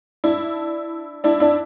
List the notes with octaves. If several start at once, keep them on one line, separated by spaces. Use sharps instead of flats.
D4 E4
D4 E4
D4 E4